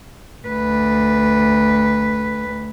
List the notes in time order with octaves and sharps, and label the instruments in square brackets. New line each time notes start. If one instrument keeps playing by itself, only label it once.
[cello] D2 B4